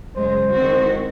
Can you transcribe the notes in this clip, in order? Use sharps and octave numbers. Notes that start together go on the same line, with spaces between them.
F#2 C#3 G#3 C5
E2 D#3 G#3 C4 F#4